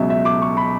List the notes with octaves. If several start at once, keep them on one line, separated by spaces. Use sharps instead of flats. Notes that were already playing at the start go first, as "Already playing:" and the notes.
Already playing: C#2 B2 F#3 E5
E5
D6
C#6
B5